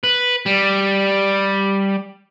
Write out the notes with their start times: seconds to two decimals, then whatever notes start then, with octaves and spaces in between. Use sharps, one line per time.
0.04 B4
0.46 G3